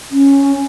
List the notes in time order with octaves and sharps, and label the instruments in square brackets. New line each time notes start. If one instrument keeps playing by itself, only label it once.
[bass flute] C#4